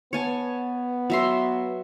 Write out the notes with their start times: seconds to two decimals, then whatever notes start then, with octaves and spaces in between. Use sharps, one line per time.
0.13 B3 C#5 G#5 A5
1.10 F#3 E5 C6